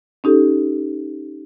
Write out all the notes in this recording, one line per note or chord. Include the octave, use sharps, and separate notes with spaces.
C#4 D#4 G4 A4